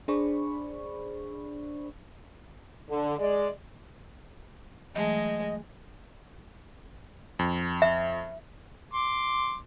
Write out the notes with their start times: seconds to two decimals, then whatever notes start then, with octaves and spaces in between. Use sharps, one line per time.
0.08 D4 G#4 C5 D5 B5 C#6
2.90 D3
3.19 G#3 D5
4.95 E3 F#3 G#3 A3 D#5
7.39 F2
7.82 E5
8.93 C6 D6